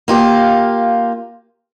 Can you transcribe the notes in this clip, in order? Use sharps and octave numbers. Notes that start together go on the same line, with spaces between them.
A#3 F4 G4